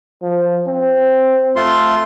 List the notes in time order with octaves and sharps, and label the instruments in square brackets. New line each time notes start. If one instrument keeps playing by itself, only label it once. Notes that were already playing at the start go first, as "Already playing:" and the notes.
[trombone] F3
C4
[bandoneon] A3 F4 C6